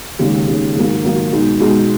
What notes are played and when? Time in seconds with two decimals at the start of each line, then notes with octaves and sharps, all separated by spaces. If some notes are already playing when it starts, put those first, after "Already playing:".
0.19 D#2 C#3 G#3 D#4
0.48 D#2 C#3 G#3 D#4
0.75 G#2 D#3 F#3 A#3
1.03 G#2 D#3 F#3 A#3
1.32 B2 G#3 D#4
1.60 B2 G#3 D#4